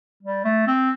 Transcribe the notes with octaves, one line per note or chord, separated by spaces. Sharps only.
G3
A3
C4